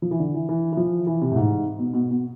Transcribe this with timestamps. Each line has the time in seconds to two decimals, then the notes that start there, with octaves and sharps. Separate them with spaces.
0.02 F3
0.11 E3
0.19 D3
0.34 E3
0.49 E3
0.73 E3
0.77 F3
1.07 E3
1.21 C3
1.32 A2
1.36 G#2
1.79 B2
1.94 B2
2.11 B2